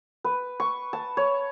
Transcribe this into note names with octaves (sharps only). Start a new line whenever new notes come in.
B4
C#6
A5
C#5